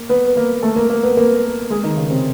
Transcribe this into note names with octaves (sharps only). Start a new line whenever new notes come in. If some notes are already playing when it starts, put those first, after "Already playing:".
Already playing: A#3
B3 B4
A#3 A#4
A3 A4
A#3 A#4
A#3 A#4
B3 B4
A#3 A#4
G#3 G#4
D#3 D#4
C#3 C#4
C3 C4